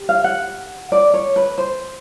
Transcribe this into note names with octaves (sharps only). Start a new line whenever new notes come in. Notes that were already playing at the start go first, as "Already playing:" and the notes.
Already playing: G4
F5
F#5
D5
C#5
B4
C5